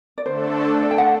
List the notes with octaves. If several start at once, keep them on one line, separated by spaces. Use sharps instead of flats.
D5
D3 A3 D4 A4 C5
D5
G5
F#5